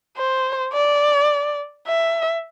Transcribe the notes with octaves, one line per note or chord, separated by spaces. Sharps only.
C5
D5
E5